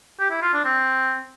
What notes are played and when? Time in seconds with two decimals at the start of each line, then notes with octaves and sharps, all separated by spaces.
0.19 G4
0.31 E4
0.42 F4
0.53 D4
0.65 C4